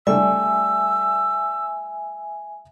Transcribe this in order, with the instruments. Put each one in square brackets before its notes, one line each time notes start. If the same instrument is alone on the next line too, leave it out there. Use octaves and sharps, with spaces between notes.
[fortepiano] G3 A3 D4 [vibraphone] E5 G#5 [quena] E6